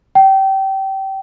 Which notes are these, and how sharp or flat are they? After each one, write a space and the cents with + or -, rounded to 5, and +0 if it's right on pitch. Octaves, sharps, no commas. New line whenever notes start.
G5 -25